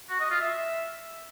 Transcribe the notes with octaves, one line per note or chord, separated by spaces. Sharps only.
F#4
D#5
F4
E5